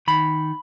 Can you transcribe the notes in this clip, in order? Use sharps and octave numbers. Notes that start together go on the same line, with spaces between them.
D#3 B5